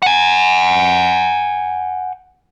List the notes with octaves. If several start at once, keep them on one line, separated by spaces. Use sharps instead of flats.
F#5 G#5